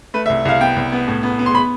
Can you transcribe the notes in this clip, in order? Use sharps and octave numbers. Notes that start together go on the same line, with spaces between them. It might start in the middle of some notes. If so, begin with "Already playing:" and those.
A3 B4
E5
C2
C2 F5
B3 G5
C2
B3
A2
B3
B3
C6
B5